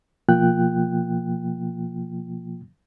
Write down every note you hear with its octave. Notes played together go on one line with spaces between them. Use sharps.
B2 F3 A#3 F4 G5 F#6